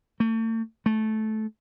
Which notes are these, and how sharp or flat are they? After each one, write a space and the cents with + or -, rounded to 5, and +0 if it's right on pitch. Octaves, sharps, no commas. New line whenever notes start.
A3 +40
A3 -15